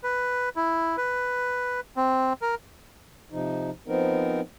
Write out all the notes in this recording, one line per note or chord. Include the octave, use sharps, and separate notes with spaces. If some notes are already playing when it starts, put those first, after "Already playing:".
B4
E4
B4
C4
A#4
C3 F3 D#4
F3 B3 C4 D#4 A#4